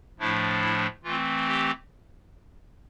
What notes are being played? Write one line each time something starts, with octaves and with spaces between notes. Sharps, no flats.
A2 F3 A3 D4 E4
E4
E3 A3 C4 F4
G4